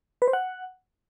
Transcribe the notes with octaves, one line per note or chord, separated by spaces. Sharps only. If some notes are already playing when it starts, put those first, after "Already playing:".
B4
C5
F#5